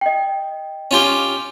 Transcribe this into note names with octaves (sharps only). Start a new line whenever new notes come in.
D#5 G5
C#4 F4 G4